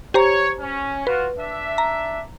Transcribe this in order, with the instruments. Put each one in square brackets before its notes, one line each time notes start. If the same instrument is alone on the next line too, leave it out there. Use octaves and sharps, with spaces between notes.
[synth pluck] G4 C5 A#5 [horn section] C#5
[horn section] C#4
[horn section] F4 F#4 [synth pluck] B4
[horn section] D4 E5
[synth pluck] A#5